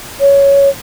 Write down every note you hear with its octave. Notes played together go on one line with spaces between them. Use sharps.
C#5